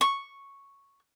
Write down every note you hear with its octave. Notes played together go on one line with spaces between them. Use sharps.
C#6